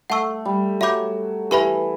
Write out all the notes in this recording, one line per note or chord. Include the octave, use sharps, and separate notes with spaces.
A3 F#5 A5 C#6 E6
G3
F#3 E5 B5 D6 G6
E3 G4 B4 E5 B5